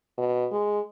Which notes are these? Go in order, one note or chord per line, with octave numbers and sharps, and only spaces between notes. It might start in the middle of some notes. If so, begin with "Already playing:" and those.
B2
G#3